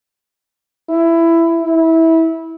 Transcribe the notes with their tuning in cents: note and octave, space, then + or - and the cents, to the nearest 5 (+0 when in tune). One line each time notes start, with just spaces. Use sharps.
E4 +15
E4 -20